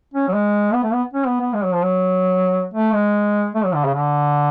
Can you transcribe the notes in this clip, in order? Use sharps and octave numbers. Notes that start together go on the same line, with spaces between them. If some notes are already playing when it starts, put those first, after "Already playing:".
C#4
F#3
G#3
B3
A3
B3
C#4
B3
B3
G#3
F#3
F3
F#3
A3
G#3
A3
F#3
D3
C#3
D3